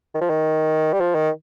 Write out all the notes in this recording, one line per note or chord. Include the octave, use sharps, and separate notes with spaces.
D#3
F3
D#3
G3
F3
D#3